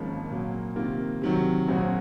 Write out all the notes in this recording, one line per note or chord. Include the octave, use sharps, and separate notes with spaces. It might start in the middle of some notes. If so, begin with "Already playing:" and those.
Already playing: G#1 G#2 F3 A#3 C#4
A#2 F#3 A#3
C3 D#3 A#3 F4
C3 D#3 F#3
A#1 A#2 F#3 C4 F#4